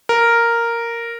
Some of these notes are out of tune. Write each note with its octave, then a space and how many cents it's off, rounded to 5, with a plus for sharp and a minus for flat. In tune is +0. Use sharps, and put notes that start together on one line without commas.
A#4 -5